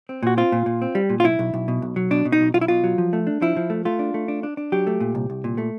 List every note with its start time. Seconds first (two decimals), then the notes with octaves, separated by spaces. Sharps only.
0.09 C4
0.23 A#2 F#4
0.37 C4 F4
0.52 A#2
0.66 A#2
0.82 C4
0.95 G3
1.10 A#2
1.20 F4
1.25 B1 E4
1.39 B1
1.54 B1
1.68 B2
1.82 B1
1.96 F#3
2.11 B2 D4
2.25 B2
2.32 D#4
2.41 B1
2.54 B1 F4
2.61 E4
2.68 B2 F4
2.84 F#3
2.98 F3
3.13 A3
3.27 D4
3.42 F3 E4
3.57 F3
3.70 A3
3.85 A3 F4
3.99 D4
4.14 A3
4.28 D4
4.43 D4
4.57 D4
4.72 F#3 G4
4.87 A3
5.00 A#2
5.15 C2
5.30 C2
5.44 A#2
5.58 A3